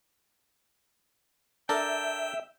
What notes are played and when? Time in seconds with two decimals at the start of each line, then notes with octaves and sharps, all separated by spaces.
1.69 D4 A4 A#4 E5 G5